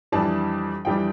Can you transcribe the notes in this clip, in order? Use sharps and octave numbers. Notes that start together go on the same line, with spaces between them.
F2 E3 G3 D4 A5
F2 E3 G3 D4 G5